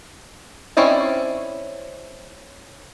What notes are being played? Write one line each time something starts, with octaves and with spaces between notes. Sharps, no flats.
C4 C#4 E4 D5 D#5